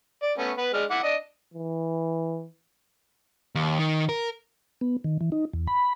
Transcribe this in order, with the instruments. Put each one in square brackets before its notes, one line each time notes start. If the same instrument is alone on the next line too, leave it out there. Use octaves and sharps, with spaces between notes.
[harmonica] D5
A3 B3 C#4
B3 B4
G#3 D4 F6
E4 F#5 D6
D4 D#5
[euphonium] E3
[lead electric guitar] D#2
D#3
A#4
[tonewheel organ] B3
D#3
E3
D#4
E2
B5